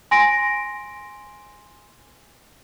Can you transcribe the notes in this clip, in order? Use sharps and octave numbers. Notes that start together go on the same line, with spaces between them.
G#5 C6 A#6 D7